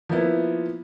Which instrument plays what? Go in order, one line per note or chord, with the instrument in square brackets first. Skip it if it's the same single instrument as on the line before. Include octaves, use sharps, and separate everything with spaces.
[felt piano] F3 A#3 B3 E4